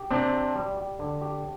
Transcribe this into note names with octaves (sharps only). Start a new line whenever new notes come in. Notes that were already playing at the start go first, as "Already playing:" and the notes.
Already playing: G4
C3 C4 D4
G4
G3
G4
D3
G4